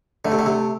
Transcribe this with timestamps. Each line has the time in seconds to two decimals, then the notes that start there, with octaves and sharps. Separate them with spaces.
0.25 D3 A3
0.32 C3
0.39 D3
0.46 C3 A3